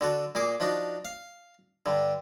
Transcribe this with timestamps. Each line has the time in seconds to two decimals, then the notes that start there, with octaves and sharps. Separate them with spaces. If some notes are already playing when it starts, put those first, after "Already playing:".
0.01 D3 F#4 A4
0.35 A#2 A#3 G#4 D6
0.60 F3 D4 D#4 F#4
1.05 F5
1.86 G2 D3